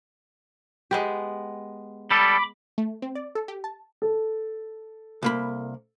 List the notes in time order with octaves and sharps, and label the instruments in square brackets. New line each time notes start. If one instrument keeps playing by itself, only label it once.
[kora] G#3 B3 G4
[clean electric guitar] G3 A4 [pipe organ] B5 D6
[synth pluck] A3
C4
D5
A4
G4
A5
[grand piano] A4
[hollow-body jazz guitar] C2 A#3 B5